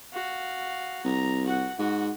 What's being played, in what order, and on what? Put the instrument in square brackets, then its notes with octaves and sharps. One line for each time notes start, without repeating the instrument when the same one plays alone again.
[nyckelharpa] F#4 F5
[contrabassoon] C2 [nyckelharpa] A#5
[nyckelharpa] F#4 F#5
[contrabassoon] G#2 [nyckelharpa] F#4